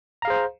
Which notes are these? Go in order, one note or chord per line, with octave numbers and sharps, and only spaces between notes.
G#4 C5 F5 A#5